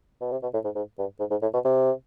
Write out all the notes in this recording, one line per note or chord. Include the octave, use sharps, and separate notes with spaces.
B2
C3
B2
A2
G#2
G#2
G2
G#2
G#2
A2
B2
C3